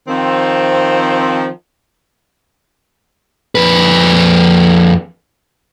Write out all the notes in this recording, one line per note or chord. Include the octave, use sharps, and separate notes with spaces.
D#3 F3 C4
F2 B4